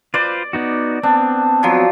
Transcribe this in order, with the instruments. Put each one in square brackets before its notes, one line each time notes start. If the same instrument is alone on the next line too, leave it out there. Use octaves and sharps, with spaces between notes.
[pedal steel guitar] F4 B4 C5 [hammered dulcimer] D5
[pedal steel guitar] B3 D#4 F#4
[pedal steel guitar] B3 C4 [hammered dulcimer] D4
[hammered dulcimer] F3 F#3